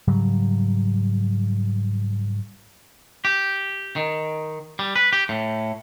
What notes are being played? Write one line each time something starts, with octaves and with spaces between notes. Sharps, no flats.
G#2 C#3 F#3 G3
G4
D#3
G3
B4
G4
A2